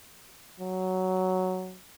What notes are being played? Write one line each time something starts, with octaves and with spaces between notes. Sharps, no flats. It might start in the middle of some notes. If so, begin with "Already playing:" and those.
F#3